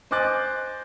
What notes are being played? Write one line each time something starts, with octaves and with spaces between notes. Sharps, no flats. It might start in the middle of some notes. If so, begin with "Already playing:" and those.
C5 D#5 G#5 D6 F#6 A6